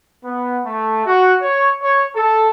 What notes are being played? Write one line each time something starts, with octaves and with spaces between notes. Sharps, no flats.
B3
A3
F#4
C#5
C#5
A4